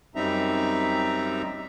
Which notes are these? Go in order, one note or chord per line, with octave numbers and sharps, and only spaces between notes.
F#2 G3 C4 D#4 E5 A#5